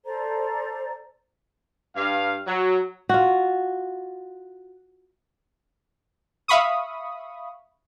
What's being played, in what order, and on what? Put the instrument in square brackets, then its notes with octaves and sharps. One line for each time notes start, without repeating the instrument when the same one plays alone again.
[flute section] A4 C5 D5 A#5
[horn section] G2 F5
F#3
[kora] F4 F#4
[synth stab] E5 F5 B5 C#6 D#6